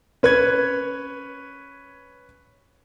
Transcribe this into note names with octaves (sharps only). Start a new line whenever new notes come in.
C#4 B4 C#5 G#6